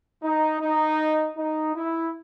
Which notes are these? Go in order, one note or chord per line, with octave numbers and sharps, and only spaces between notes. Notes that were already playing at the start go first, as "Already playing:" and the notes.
D#4
D#4
D#4
E4